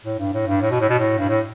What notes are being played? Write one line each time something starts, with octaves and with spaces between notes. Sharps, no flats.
A2
G2
A2
G2
A2
B2
A2
B2
A2
G2
A2